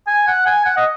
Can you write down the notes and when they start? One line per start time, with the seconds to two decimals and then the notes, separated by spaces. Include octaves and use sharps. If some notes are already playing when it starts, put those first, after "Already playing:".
0.07 G#5
0.27 F#5
0.46 G#5
0.65 F#5
0.77 D#5